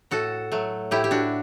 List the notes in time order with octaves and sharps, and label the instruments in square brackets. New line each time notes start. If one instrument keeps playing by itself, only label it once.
[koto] A2 F#4 A4
F#3 A3
A2 E4 G4
G4
D4 F#4